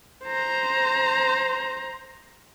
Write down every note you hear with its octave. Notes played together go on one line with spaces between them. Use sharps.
C5 A#5